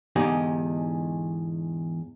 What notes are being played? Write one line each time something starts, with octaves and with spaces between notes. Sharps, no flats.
E2 G#2 D3 D#4 G4